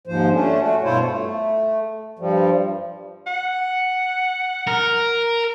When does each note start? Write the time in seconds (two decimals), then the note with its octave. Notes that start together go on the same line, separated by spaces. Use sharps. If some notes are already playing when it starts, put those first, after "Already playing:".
0.07 D#2 G#2 F3 C5
0.32 A3 C#4 D4
0.61 A3 F#4
0.84 G2 B2 E4 F4 C5 C#5
1.06 A3
2.19 G2 F3 G3
3.27 F#5
4.67 A#4